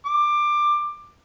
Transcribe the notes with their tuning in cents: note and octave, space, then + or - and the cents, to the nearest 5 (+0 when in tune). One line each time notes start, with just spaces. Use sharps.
D6 +15